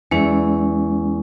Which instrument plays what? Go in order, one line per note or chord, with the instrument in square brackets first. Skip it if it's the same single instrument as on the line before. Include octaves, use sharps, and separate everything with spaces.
[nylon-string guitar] E2 E4 D5 [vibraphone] G#3 C#4